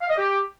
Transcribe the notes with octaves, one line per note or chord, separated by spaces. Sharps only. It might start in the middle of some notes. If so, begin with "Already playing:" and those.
F5
D#5
G4